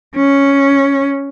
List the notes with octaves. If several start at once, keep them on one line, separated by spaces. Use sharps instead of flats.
C#4